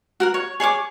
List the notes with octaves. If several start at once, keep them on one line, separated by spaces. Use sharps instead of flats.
F#4 A#4 F#5
C#5
G#4 C#5 G#5 D6